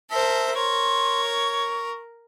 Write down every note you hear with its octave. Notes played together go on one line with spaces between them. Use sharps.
A#4 C5 E5 A5
A#4 C#5 C6
C#6